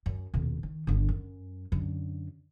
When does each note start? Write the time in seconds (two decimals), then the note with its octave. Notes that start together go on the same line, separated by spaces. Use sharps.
0.06 F#2
0.34 D#1 B2
0.63 D#3
0.87 G1 D3
1.09 F#2
1.72 F#2 D3